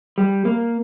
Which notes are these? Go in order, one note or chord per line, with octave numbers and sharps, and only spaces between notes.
G3
A#3